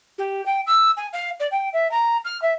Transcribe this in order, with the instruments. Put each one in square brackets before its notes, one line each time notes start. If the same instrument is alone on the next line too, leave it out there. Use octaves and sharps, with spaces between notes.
[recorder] G4
G5
E6
G#5
F5
D5
G5
E5
A#5
F6
E5